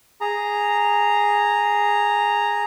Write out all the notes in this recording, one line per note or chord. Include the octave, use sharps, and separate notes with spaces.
G#4 A#5